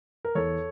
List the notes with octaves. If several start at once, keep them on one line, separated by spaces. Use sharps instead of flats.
A#4
E2 A4 C#5